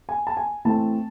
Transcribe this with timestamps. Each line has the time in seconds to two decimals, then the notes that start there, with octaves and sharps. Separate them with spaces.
0.09 G#5
0.27 A5
0.37 G#5
0.65 A2 E3 A3 C4 A5